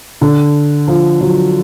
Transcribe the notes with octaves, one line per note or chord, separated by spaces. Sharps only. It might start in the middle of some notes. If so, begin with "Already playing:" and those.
D3
F3
F#3